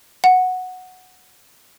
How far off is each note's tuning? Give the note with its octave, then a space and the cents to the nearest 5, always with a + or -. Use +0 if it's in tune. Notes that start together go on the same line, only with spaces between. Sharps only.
F#5 -5